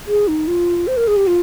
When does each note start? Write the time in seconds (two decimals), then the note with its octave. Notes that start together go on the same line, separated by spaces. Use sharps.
0.07 G#4
0.28 D#4
0.47 F4
0.87 C5
0.97 A#4
1.07 G#4
1.17 G4
1.27 F4